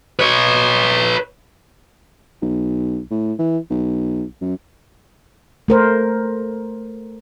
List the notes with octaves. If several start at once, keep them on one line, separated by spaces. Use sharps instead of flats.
B4 C#5
B1
A2
E3
B1
F#2
A3 A#4 C5